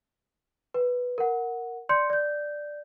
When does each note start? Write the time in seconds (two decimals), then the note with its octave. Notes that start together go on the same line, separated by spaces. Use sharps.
0.74 B4
1.18 A#4 F#5
1.89 D5 C6 G6 C#7
2.10 D5 G6